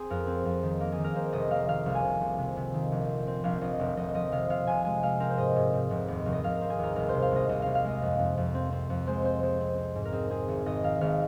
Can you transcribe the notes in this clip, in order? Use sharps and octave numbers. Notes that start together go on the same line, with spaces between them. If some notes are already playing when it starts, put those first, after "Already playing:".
Already playing: C4 G#4
F2 A#4
C4
F2
D#3
A#3
G#4
D#3
A#4
A#3 C5
F1 D#5
A#3 F5
D#3 F5
C2
G#5
C2
C2
C3
C3
D#3
A#1
C4
C4
A#1 F5
A#1 D#5
F1
F1 D#5
F3 D#5
C3 F5
C3 F5
C3 G#5
G#3 G#5
G#3 F5
C4 A#4
C5
G#2 D#5
G#2
G#2
F1
D#2
F1
D#5
F1 F5
A#4
C4
G#4
D#2 A#4
C2 A#4
C5
C3
F5
C2 D#5
C2 D#5
C2 F5
F5
G#3 D#5
F2
F2
F2
C4
C4
F2
G#3 C5
C4 C5
G#3 C5
C4
C4
G#2
A#4
C4 G#4
C4 G#4
G#1
G#1 D#5
D#3 F5
G#1 F5